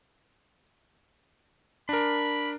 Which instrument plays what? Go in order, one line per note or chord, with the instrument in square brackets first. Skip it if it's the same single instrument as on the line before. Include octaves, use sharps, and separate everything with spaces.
[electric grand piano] D4 A#4 [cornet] B5